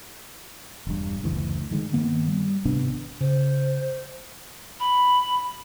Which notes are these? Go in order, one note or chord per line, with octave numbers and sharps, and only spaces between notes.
E1 G2
F#1 D2 E3
D3 D#3 G#3
G2 D#3 A#3 B3
G3
G#1 C3 B3 D4
C#3 C5
B5